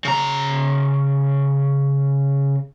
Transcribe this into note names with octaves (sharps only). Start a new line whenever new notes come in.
C#3 A#5